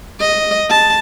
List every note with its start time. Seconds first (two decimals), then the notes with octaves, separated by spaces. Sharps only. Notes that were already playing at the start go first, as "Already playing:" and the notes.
0.20 D#5
0.70 A5